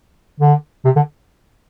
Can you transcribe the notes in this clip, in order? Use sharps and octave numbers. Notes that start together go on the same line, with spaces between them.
D3
C3
D3